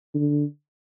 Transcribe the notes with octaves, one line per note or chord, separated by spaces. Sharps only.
D3